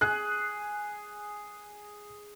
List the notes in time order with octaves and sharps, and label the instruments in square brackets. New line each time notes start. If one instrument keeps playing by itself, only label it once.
[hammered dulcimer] G#4 [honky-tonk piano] F#6